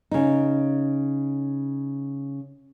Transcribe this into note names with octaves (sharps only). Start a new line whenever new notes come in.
C#3 D#4